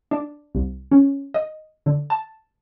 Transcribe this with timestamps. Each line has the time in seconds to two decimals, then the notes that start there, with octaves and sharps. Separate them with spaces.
0.11 D4
0.55 C2
0.91 C#4
1.34 D#5
1.86 D3
2.10 A5